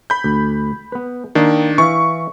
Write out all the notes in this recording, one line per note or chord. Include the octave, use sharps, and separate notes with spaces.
B5 G6
D2
B3 B4
D#3 A#3 D4
E3 E5 F5 C#6